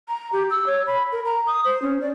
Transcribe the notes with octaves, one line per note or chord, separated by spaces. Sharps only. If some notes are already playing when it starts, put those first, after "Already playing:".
A#5
G4
E6
C#5
B5
A#4
A#5
D#6
C5
C#4
D5